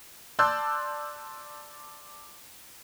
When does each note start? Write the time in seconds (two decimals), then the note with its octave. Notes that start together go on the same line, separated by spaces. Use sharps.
0.39 D5 A5 C6 E6 F#6 G6